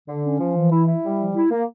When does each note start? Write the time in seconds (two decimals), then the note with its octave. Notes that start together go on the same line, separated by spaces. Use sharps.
0.08 D3
0.25 C#4
0.40 F3
0.56 E3
0.72 E4
0.88 E4
1.04 G3
1.20 F3
1.35 E4
1.51 A#3